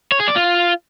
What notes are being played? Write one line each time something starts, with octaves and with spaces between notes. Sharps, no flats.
C#5
G#4
D5
F4